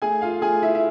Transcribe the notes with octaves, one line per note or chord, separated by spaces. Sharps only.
A3 G#4 G#5
F4 F5
A3 G#4 G#5
E4 E5
E5